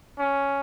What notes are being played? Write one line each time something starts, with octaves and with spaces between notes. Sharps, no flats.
C#4